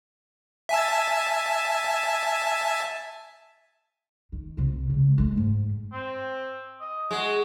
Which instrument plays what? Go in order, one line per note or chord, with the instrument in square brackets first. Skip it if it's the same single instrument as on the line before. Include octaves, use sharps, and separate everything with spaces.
[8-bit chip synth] E5 G#5 A5
[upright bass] D#3
C2 C3
C#3 G#3
G#3 A3
G#2 F3
[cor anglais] C4
D#5
[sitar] G#3 [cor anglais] F#4